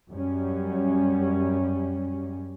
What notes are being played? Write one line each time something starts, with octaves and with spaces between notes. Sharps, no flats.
F#2 G3 C#4